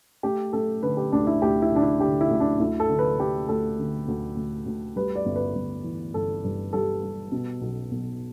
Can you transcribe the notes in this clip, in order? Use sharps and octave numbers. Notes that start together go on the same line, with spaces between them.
A3 G4
A3 A4
D3 B4
G4
D2 D4
E4
D2 G4
E4
D3 D4
E4
D3 G4
E4
D2
D4
D2 E4
A4
D3
B4
A3 G4
D2 A4
D3
D2
D2
D2
G3 B4
D5
G1
B4
G1
E3
G1 A4
G2
G3 A4
G3
B2
B1
B1